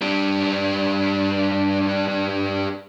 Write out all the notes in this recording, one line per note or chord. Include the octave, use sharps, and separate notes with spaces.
G3 D4